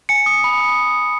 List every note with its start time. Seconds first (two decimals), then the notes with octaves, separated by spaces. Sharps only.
0.09 G#5 C#7
0.26 D#6
0.44 B5
0.61 D#6